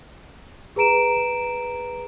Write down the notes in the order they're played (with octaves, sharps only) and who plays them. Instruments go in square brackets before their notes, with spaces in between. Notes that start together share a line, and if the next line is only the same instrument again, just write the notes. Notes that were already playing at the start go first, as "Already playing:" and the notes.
[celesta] G#4 B4 A#5 D7 E7